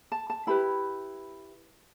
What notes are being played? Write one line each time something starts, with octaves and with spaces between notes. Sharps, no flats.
A5
A5
E4 G4 B4 B5